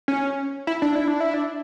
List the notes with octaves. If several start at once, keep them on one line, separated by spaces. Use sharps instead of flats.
C#4
E4
D4
E4
D4
E4
D4